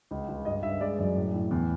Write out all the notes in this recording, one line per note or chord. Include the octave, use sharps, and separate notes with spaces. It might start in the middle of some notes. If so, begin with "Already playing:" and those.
C#2
C#2
G2 D#5
G2 E5
G#3 D5
F#2 D5
A2
A2
E2